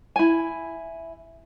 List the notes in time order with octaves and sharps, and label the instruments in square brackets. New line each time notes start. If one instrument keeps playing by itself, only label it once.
[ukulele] E4 G#5